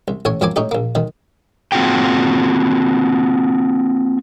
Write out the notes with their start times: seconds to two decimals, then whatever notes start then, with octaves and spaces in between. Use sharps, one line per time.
0.08 C2
0.25 A1 A2 C#5 G#5
0.41 F#2 F3 A#3 C4 G#5 D6
0.56 A2 C#4 D#4 G4
0.71 A#1 A#3
0.95 B1 D#3
1.72 A#3 C4 F4 F#4 G#4 G5